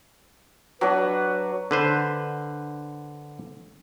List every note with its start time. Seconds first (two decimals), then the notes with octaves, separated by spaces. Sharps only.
0.81 F#3 D4 B4
1.71 D3 B4 C5